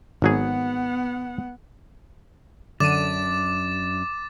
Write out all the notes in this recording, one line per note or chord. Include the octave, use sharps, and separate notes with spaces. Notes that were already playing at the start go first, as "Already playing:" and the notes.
G#1 F#3 B3 G#4 F#5
F#2 D3 D4 D6 A6 D#7 E7